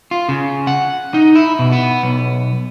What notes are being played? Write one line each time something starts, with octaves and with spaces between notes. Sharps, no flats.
F4
C#3
F#5
D#4
E4
B2
B3
B1